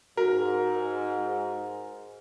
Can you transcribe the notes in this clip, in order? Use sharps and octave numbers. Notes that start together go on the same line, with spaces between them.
G#2 F#4 A#4